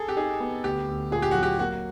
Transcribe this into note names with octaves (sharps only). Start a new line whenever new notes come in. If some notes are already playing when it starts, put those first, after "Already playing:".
Already playing: G#4 A4
G4
D#4 G#4
B3
D2 G4
D2
A#2 G#4
G4
F#3 F#4
G4
A#3 F#4